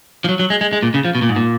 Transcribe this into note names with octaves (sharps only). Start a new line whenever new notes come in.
F3
F#3
F#3
G#3
G#3
G#3
A#2
C#3
F3
B2
A#2
G#2
A#2